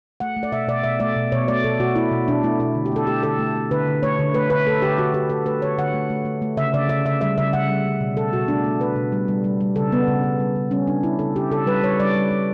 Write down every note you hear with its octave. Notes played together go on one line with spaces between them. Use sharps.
A3 F#5
A3
D5
B2 E5
B2 D5
B2 E5
A3 D5
B2
B2 C#5
A3 D5
B2 A4
B2 F#4
A3 E4
B2
B2 D4
A3 E4
B2 E4
D3
G4
A3 A4
A3 G4
D3 A4
A3
A3
D3 B4
D3
A3 C#5
D3
A3 B4
D3 B4
A3 A4
D3 G4
D3 F#4
D3 G4
A3 A4
A3 B4
D3 C#5
D3 F#5
A3
A3
A3
A3
C#3 E5
C#3 D5
C#3 E5
C#3 E5
G3 E5
C#3 E5
C#3 F#5
G3
A3
B2
B2 A4
B2 F#4
A3 D4
A3
A3 B4
B2
G3
G3
G3
G3
C#3 A4
C#3 B3
C#3
C#3
G3
C#3
G3 C#4
C#3 D4
C#3 E4
C#3 A4
C#3 G4
C#3 A4
G3 B4
G3 C#5
G3 D5
G3
G3